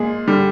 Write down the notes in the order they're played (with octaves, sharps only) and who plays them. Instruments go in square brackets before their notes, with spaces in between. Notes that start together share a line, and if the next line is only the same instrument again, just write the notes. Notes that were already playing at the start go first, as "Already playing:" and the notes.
Already playing: [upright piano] A#2 G#3 G#4
D3 G3